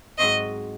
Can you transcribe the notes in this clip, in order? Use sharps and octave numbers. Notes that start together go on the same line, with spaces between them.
G#2 F#3 C4 F#4 C5 D#5